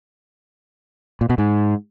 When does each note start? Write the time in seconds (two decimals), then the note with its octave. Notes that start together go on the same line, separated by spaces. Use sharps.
1.21 A#2
1.30 B2
1.38 G#2